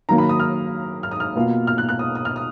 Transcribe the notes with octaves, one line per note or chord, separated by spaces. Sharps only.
D#3 F#3 A#3 A#5
B5
D#6
F6
F6
D#6
F6
B2 A#3 F4
F6
F#6
F#6
D#6
D#6
F6
D#6